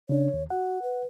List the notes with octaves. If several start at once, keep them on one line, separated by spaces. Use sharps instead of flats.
C#3 D4 C#5
D#2
F#4 F#5
B4